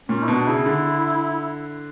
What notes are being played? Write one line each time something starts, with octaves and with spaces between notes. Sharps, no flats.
A#2 C#4
E4
B2 D4
C#3 E4
D3